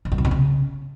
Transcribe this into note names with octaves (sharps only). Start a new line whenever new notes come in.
C3
G2
C3
B2
C#3